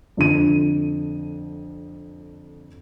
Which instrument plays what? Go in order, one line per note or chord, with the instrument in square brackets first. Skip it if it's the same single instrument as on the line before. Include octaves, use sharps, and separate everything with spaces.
[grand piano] F2 D3 D#7